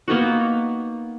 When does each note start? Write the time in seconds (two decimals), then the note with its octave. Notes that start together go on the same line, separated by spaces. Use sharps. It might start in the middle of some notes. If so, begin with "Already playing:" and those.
0.08 A#3 B3 D#4 F#4